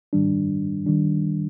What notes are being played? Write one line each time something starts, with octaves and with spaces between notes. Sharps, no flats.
G#2 D#3 G3 D4
D#3 G3 D4